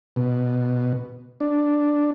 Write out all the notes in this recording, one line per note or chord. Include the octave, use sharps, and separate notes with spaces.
B2
D4